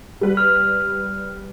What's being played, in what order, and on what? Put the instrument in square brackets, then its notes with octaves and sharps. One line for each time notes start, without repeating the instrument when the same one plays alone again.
[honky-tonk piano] G3 B4
[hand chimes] F6